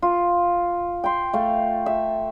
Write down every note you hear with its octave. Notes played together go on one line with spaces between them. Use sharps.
F4
G5 C6
A3 F5
E5